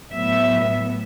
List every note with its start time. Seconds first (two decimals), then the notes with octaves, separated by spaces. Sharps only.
0.14 A2 F#3 B3 E5